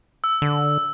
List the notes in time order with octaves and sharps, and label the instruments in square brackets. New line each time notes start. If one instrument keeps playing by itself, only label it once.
[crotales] E6
[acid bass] D3